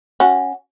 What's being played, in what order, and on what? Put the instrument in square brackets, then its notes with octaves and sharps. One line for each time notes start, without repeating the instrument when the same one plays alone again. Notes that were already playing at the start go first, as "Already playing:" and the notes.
[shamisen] C#4 F#4